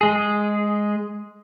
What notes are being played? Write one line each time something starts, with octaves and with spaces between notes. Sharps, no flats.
G#3 G#4